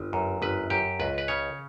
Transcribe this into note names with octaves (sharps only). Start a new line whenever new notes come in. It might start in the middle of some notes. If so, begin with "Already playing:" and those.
Already playing: G1
F#2
G1 B4
F#2 G4
C#2 B4
B4
C#3 C#5